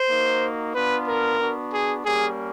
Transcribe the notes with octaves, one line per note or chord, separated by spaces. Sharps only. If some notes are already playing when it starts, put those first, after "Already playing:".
Already playing: C5
A#3 D#4 F#4
B3 D4 F4 B4
A#4
B3 D4 F#4
G#4
G3 A#3 C#4 G#4